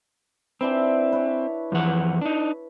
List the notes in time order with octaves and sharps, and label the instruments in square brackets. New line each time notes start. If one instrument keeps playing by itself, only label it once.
[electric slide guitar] C4 [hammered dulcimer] D4 E4 B4
[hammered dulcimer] B4 C#5
[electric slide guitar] F2 E3 F#5
D4 D#4